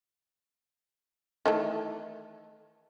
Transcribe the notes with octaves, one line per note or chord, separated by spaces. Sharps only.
D#3 E3 A3